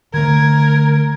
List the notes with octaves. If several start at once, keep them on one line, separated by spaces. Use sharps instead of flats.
D3 A3 A#4 G#6